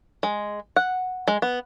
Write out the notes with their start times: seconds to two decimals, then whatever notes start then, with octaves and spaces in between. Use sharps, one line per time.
0.23 G#3
0.76 F#5
1.28 G#3
1.42 B3